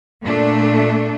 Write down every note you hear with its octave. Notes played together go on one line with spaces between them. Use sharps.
A#2 A3 D4